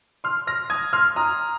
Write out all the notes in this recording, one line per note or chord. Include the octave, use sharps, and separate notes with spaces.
C6 F6
F6 A#6
D#6 G#6
C6 F6
A#5 D#6